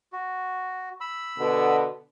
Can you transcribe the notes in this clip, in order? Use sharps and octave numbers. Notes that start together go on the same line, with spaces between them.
F#4
B5 E6
B2 D3 B3